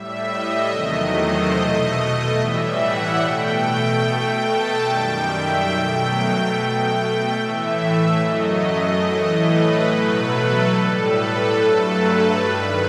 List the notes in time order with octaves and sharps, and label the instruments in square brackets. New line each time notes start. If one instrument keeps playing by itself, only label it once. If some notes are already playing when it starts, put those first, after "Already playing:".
Already playing: [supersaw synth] A2 G3 E5
D#5
E2 C3 D#3 F#3 A3 D#5
C5
B2 A3 D#5
A2 E3 G3 E5
F#5
B2 A3 G5
B2 A3 G5
A5
F#2 D#3 G3 G5
E5
B2 F#3 A3 G5
B2 A3 G5
A2 E3 A3 E5
F#2 F#3 A3 D#5
A2 E3 A3
B4
B2 F#3 A3 B4
A4
A2 G3 A4
B4
G2 F#3 A3 A4
B4
G2 D#3 G3